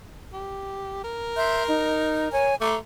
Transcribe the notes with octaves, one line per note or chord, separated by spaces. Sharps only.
G4
A#4
E5 C6 G6
D#4
C#5 G#5
A3 A#5 C6 D6